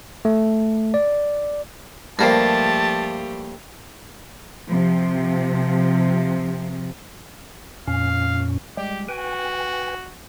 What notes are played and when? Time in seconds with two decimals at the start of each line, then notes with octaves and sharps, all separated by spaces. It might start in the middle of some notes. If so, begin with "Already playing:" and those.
0.25 A3
0.94 D5
2.19 G2 F3 A3 A#3 G4 A#4 C5 A5
4.68 C3 F3
7.88 F2 A#2 C#4 F5
8.77 G3 G#3 G4
9.09 F#4 B4 G5 G#5